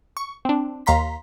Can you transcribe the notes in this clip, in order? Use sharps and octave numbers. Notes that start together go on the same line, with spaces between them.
C#6
C4 D4
D#2 F5 A#5 C6 B6